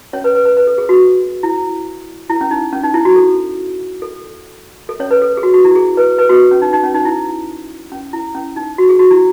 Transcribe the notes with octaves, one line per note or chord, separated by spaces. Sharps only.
C#4 C#5
B4
B4
B4
B4
A4
G#4
F#4
E4
E4
C#4
D#4
C#4
D#4
E4
F#4
A4
A4
A4
C#4 C#5
B4
A4
G#4
F#4
F#4
E4
G#4
B4
B4
F#4
C#4
D#4
D#4
C#4
D#4
E4
C#4
E4
C#4
D#4
F#4
G#4
F#4
E4